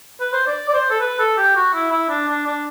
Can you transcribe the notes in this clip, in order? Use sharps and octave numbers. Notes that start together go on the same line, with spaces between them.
B4
C5
D5
D5
C5
A4
B4
A4
G4
F#4
E4
E4
D4
D4
D4